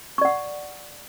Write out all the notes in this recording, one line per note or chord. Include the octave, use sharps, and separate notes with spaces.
D5 F#5 C#6